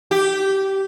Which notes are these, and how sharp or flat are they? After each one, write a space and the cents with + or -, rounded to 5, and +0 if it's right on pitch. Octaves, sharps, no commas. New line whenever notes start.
G4 -15